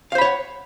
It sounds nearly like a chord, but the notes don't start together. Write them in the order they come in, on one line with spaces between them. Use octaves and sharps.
F5 C5 B5 C#5 F#5